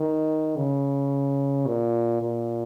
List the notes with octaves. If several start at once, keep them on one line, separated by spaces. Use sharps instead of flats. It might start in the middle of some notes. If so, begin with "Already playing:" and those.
Already playing: D#3
C#3
A#2
A#2